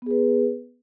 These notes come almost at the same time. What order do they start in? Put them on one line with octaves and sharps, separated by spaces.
B3 G#4 B4